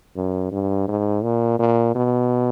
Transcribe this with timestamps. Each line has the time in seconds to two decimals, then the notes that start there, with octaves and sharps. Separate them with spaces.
0.16 F#2
0.52 G2
0.88 G#2
1.23 A#2
1.59 A#2
1.95 B2